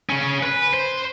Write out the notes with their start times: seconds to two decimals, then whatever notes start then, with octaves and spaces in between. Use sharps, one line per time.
0.09 C#3 C#4
0.43 B4
0.74 C5